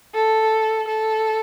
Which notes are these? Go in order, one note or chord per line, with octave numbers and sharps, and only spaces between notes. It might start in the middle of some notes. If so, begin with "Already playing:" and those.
A4
A4